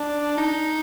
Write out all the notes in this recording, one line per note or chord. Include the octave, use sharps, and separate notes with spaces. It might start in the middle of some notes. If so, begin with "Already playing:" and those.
Already playing: D4
D#4